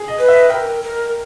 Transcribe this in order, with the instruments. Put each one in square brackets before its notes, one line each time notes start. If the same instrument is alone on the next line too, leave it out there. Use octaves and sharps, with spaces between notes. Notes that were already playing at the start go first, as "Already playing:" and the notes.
Already playing: [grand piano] G#4
D#5
[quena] B4
[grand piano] E5
[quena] A#4 [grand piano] G5
[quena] A#4